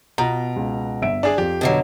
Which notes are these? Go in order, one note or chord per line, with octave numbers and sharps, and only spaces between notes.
B2 F4 A#5
C#2
G1 E5 D7
D4 G#4 D5
F2 G4
B2 D3 F#3